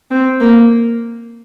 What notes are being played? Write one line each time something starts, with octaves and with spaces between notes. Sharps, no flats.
C4
A#3